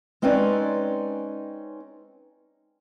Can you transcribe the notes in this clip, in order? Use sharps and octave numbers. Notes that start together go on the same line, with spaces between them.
G#3 C4 C#4 D#4 B4 D5